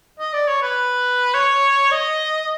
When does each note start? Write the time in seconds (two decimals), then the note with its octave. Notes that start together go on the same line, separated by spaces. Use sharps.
0.20 D#5
0.34 D5
0.48 C#5
0.62 B4
1.35 C#5
1.92 D#5